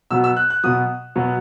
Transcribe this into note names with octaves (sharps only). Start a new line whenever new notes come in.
B2 F#3 B3 E6
E6
F#6
F#6
B2 F#3 B3 D#6
B2 F#3 B3